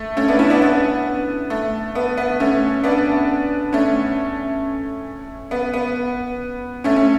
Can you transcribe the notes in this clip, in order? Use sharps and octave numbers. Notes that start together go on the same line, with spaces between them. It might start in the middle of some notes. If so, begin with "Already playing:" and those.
Already playing: A3
A3 C#4
B3 D4
C#4 E4
B3 D4
B3
A3
B3
B3
A3 C#4
B3 D4
A3 C#4
B3
B3
A3 C#4
C#4